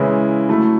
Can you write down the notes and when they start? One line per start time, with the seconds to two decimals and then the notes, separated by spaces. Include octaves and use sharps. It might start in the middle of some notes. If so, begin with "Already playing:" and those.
Already playing: C#3 E3 G#3 C#4 E4
0.49 F#3 A3 E4